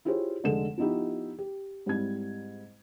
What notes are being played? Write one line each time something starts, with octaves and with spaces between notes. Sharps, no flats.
E4 F4 G4 G#4 C5 C#5
F1 D3 G#3 A4 E7
F3 B3 D#4 E4 G4
G4
G#2 G3 C4 E4 G#6